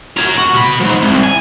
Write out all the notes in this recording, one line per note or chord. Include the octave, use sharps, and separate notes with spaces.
A#4 C#5
F#4
B2 B5
G#2 F3
C2
G#5